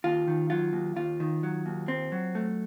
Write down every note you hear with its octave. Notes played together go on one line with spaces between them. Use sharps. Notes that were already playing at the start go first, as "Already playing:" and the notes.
D#2 F4
D#3
F#3 F4
D#2
D#2 F4
D#3
F#3
D#2
C4
F#3
A3